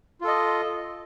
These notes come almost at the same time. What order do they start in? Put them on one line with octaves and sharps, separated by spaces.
F4 A4 D#5